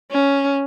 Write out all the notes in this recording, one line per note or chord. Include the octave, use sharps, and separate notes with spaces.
C#4